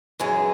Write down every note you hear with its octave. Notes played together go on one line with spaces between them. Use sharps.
F#2 E3 G#3